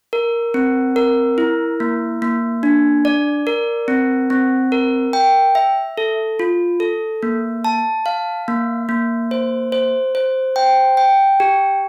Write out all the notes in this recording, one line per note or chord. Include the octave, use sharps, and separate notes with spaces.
A#4
C4
A#4
E4
A#3
A#3
D4
D5
A#4
C4
C4
A#4
G5
E5
A4
F4
A4
A#3
A5
F5
A#3
A#3
C5
C5
C5
G5
G5
G4